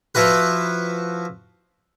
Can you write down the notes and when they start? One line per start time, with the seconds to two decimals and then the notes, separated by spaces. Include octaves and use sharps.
0.15 F3 E4 F#4 B4